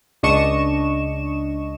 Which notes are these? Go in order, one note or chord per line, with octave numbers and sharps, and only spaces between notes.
C#2 D4 D#5 C#6 E7